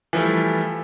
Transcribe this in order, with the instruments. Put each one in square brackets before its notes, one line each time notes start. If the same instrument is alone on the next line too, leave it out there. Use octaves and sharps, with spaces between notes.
[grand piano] E3 F3 G3 A3